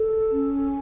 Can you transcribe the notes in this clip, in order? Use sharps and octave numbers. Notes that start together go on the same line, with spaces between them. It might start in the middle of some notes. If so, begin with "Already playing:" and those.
Already playing: A4
C#4